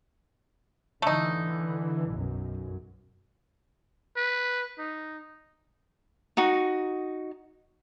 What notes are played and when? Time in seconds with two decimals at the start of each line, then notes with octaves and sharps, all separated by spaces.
1.02 D3 E3 A3 D#4
2.09 B1 F#2
4.17 B4
4.79 D#4
6.37 D#4 F#4